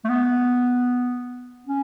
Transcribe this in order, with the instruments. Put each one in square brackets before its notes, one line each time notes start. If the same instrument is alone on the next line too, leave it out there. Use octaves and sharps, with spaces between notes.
[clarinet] A3
B3
C#4